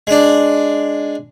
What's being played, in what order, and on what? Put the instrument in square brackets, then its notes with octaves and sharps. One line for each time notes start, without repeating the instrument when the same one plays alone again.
[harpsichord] G#3 D4